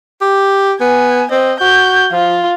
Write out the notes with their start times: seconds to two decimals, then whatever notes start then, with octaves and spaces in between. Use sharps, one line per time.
0.21 G4
0.80 B3 G#5
1.31 C4 D#5
1.61 F#4 G6
2.12 F3 F4